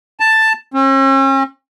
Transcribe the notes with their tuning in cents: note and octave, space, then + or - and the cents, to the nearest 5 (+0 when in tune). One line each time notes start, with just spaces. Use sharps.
A5 +5
C#4 -45